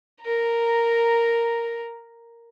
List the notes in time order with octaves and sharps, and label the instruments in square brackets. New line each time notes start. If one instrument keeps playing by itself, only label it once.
[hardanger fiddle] A#4 A#5